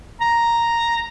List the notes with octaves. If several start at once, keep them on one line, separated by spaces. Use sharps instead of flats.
A#5